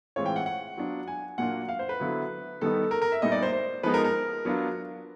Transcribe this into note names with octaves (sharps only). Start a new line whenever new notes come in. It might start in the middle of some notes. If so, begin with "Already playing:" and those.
A2 E3 G#3 C4 F4 C#5
G5
F#5
F#5
F#3 B3 D4 F4
G#5
A#2 F#3 A#3 D4 F4 F#5
F5
C5
B4
D3 F#3 B3 E4
D#3 G3 B3 D#4 A4
A#4
A#4
E5
A#2 G3 B3 D#4 D#5
D5
C5
C5
F3 G#3 B3 D#4 B4
A#4
A#4
F#3 B3 D4 F4